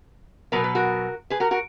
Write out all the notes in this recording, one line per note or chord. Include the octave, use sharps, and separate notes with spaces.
B2 F#3 B3 A#4
B4
F#4 A#4
G#4 B4
F#4 A#4
F#4 A#4